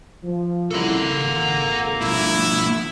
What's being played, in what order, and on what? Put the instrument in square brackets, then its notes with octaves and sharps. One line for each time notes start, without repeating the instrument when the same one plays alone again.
[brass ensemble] F3
[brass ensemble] C2 C#3 E4 [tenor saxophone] A#3 [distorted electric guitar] A4 F#5
[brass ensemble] G#1
[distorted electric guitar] B2 F3 [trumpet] E4